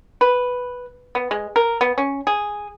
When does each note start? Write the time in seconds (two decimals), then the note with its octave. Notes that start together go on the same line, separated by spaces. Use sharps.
0.21 B4
1.15 B3
1.31 G#3
1.56 A#4
1.81 B3
1.98 C#4
2.27 G#4